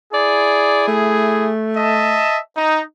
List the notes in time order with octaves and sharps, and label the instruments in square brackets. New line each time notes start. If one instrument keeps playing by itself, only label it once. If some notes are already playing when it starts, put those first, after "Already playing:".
[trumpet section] E4 G#4 [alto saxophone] D5
[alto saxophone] A3
[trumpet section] D#5 E5 A5
D#4